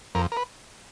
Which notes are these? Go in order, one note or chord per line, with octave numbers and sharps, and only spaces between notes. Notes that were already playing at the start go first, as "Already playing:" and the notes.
F2 A#4
A#4
B4